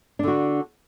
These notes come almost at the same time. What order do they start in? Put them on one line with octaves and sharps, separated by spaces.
D4 D3 F#4